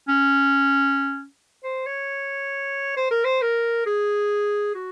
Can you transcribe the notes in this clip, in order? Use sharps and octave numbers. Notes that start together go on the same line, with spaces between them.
C#4
C5
C#5
C5
A#4
C5
A#4
G#4
F#4